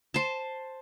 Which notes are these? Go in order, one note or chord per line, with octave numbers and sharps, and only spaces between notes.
C5 A5